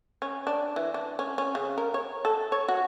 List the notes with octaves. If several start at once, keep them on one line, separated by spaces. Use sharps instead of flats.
C#4
D4
E3
D4
C#4
C#4
C#3
A#4
C#5
A4
C#5
F#4